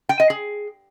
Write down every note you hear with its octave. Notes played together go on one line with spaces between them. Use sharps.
G5
D#5
G#4